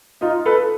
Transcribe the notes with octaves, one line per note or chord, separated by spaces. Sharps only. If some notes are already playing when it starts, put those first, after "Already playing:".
D#4 F4
A4 B4